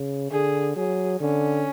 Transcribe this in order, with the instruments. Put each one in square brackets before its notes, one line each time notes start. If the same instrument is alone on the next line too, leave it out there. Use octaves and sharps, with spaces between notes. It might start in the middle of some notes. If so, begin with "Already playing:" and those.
Already playing: [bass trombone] C#3
[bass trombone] D3 [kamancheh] G#4
[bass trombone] F#3 [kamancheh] G#4
[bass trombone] D3 [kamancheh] C#4